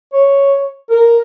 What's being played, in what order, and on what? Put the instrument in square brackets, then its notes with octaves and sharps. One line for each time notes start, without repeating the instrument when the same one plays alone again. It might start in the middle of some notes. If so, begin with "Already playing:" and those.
[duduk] C#5
A#4